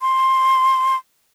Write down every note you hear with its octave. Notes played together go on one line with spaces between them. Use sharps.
C6